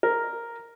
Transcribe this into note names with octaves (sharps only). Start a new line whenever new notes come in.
A#4